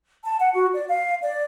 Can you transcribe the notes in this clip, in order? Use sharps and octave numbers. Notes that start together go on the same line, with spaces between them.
A5
F#5
F#4
D5
F5
D5